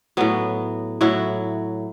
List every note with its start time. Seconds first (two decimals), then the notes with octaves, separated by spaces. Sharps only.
0.17 A2 F#3 B3
1.01 A2 F#3 E4